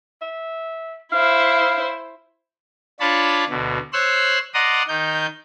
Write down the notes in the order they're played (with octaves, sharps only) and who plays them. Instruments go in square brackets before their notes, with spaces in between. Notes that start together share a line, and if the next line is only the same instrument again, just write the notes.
[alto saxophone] E5
[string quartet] E4 C5 [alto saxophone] F5
[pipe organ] D4 F4 C#5 A5 B5
D2 B2
C5 C#5 C6 E6 F#6
D5 D#5 F#5 A#5 C6 D#6
D#3 D#4 G6